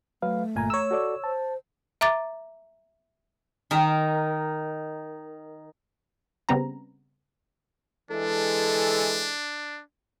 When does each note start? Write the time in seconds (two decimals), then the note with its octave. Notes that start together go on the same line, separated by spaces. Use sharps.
0.22 F#3 A3 B4 F5
0.56 G1 E2 A#2 G#5 A#5
0.70 C#5 E6
0.91 F#4 A4 D5
1.24 C5 A5
2.01 E5 A#5 D6 A6
3.71 D#3 A#4
6.49 C#3 G3 B3 C4 A#5
8.11 E3 G#3 D4 A4